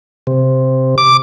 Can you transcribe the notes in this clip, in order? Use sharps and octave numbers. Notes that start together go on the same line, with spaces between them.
C3
D6